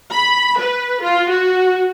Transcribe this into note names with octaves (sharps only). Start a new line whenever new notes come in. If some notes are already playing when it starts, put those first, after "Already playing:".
B5
B4
F4
F#4